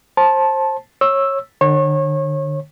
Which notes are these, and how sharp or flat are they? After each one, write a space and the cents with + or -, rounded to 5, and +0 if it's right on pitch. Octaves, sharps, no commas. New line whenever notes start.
C5 +25 A5 -10
C#5 -20 E6 +0
D3 +40 C#5 -30